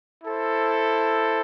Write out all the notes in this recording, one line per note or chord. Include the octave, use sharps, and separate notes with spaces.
E4 A4 C5